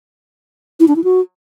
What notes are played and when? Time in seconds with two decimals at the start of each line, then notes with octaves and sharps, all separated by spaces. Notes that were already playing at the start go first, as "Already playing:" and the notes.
0.80 E4
0.88 D4
0.96 E4
1.04 F#4